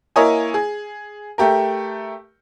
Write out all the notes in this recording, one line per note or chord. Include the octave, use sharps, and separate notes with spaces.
A#3 E4 A#4 C#5 D#5 G#5
G#4
A3 G4 A#4